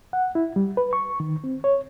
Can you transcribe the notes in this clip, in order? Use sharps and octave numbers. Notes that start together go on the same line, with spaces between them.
F#5
E4
G3
B4
C#6
D#3
C4
C#5